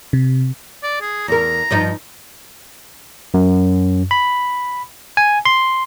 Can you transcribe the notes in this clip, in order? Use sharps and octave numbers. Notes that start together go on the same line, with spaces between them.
C3
D5
G#4
E2 A#4 A#5
G2 F3 D#4
F#2
B5
G#5
C6